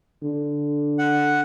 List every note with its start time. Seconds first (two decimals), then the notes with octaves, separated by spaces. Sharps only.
0.23 D3
0.99 F#5